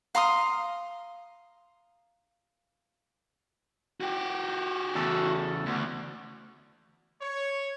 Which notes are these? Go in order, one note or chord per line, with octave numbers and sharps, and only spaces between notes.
F5 A#5 C6 D#6
F#4 G4
E2 C#3 A4
D2
C#5